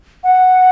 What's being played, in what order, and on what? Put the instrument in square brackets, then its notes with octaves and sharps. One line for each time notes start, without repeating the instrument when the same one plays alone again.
[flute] F#5